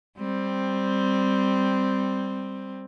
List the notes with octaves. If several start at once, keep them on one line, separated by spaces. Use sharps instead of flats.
G3 C4